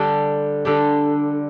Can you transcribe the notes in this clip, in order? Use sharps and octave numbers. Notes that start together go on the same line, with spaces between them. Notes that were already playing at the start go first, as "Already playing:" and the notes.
Already playing: D3 G3 D4 G4
D3 G3 D4 G4